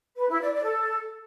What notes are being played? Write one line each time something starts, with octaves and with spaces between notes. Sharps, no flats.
B4
E4
D5
D5
A4